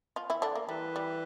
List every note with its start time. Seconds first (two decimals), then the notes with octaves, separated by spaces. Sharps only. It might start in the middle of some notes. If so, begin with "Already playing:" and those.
0.16 F3 F4
0.30 E3 E4
0.42 D3 D4
0.55 A#3
0.69 E3 G3
0.96 G3